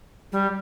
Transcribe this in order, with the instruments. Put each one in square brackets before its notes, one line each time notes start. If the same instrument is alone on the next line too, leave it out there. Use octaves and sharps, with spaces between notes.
[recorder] G3